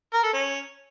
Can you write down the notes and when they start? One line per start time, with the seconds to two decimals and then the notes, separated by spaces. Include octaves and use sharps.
0.13 A#4
0.24 A4
0.34 C#4